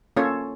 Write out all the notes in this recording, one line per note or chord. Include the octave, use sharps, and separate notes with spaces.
A#3 C#4 F4 A4 C#5